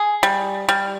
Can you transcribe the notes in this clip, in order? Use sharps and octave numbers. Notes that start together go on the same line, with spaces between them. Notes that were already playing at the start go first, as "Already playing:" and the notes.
Already playing: G#4
G3
G3